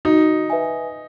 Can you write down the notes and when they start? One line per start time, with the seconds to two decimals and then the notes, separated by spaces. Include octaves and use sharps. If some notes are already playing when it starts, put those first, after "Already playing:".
0.05 D#4 F#4
0.50 B4 E5 G#5